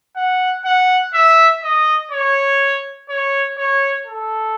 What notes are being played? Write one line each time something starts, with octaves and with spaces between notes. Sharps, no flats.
F#5
F#5
E5
D#5
C#5
C#5
C#5
A4